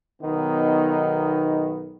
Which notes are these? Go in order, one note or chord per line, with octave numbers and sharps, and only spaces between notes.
B1 D#3 B3 D#4